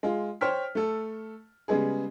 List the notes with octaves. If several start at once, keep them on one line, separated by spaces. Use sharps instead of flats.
G#3 F4
C5 C#5 G5 F6 B6
A3 A4
C#3 G3 G#3 B3 G#4